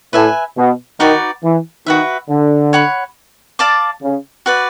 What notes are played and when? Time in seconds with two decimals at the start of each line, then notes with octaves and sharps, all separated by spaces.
0.13 A2 B4 E5 G#5
0.57 B2
0.99 D#3 D#4 F#4 B4 D5
1.43 E3
1.86 D#3 F#4 B4 E5
2.29 D3
2.73 C#5 F#5 B5
3.59 D5 F5 A5 D6
4.02 C#3
4.46 F#4 B4 D5